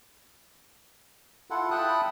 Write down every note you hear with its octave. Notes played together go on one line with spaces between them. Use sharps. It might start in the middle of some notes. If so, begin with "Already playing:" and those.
E4 F4 A4 F#5
E5 G5 A5 B5 D#6 F#6